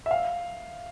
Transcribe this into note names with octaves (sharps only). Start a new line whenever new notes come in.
E5
F5